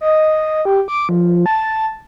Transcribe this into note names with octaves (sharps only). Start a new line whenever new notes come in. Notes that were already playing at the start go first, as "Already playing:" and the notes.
D#5
G4
D6
F3
A5